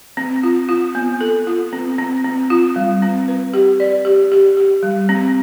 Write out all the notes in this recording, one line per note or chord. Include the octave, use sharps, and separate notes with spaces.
C4
F4
F4
B3
A4
F4
C4
C4
C4
F4
G3
C4
B4
G4
D5
G4
G4
G4
G3
C4